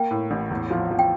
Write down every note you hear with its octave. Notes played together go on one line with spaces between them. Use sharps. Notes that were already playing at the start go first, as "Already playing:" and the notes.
Already playing: A#3 G5
A2
A1
E2
F3
F3
G5